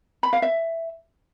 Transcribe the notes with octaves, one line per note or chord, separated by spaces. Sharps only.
B5
F5
E5